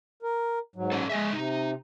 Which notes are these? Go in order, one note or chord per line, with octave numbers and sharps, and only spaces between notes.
A#4
G#2 F#3
C#4 A4
G#3 G#4 D#5 E5
C3 D#4